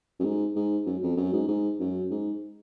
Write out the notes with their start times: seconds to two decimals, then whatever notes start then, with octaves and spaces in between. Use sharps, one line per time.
0.19 F#2
0.24 G#2
0.56 G#2
0.86 F#2
1.02 F2
1.17 F#2
1.33 G#2
1.48 G#2
1.80 F#2
2.10 G#2